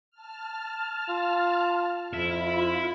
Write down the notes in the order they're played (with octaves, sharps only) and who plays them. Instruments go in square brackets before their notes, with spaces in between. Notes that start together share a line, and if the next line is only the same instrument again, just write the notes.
[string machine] A5 F6
[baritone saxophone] F4
[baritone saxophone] F2 [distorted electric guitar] E4 E5 [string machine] F4 B5